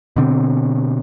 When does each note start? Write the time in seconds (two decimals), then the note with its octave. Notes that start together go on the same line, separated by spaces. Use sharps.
0.16 B2 D3 C4